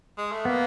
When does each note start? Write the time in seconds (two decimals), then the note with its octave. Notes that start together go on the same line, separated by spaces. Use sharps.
0.18 G#3
0.32 A3
0.45 A#3 B3